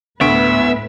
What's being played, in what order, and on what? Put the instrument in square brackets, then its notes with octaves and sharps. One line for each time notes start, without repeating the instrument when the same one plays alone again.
[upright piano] D2 C#6 D7 [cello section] A2 B4 [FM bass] B3 [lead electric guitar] E5